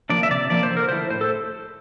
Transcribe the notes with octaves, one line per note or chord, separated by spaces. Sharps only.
F3 A#3 D4 D5
E5
C3 D5
F3 A#3 D5
C5
D3
A#4
A3 E4 C5
A2 C5
A4